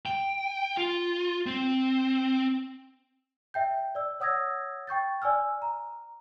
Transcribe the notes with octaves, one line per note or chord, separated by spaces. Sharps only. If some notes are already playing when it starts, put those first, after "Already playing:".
G5
F4
C4
E5 G5 G6
D5 E6
C#5 F#5 D#6 E6 G#6 A#6
G5 C#6 G6 A6
D5 G#5 E6 F6
A#5